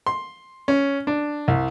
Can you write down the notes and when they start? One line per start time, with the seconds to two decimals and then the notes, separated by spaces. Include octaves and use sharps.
0.07 C6
0.68 C#4
1.07 D4
1.48 C2